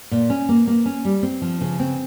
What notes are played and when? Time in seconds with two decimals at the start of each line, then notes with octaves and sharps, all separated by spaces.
0.11 A#2
0.30 C#4
0.49 A#3
0.67 A#3
0.86 C#4
1.05 G3
1.23 C4
1.42 F3
1.61 C#3
1.80 C4